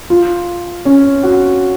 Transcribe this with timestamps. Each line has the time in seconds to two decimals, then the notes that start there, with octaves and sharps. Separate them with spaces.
0.10 F4
0.85 C#4
1.23 F#4